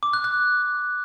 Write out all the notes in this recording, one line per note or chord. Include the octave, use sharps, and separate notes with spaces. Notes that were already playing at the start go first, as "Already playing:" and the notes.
D6
F#6
F#6